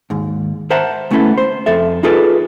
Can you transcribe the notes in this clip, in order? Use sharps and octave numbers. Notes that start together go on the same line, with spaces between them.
D#2 G#2
A#4 C5 E5 F#5 A5 A#5
C#2 A3 B3 C#4 E4 A4
C5
F2 A4 E5
D#4 F4 G#4 A4 B4 D5